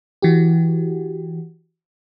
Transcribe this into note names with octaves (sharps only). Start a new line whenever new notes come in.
E3 F#4 G4